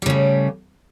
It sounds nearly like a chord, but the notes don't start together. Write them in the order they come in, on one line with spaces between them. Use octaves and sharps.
G3 C#3 A2